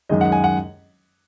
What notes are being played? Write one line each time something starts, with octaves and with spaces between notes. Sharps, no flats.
F#2 D#3 G#3 D#5
F#5
G#5
F#5